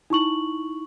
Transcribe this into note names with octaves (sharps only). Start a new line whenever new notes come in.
D#4 E4 C#6 F#7